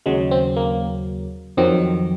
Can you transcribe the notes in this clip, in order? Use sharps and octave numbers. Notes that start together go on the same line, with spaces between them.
D#2 C#3 F#3 G#3
C4
A#3
F2 D#3 F#3 C4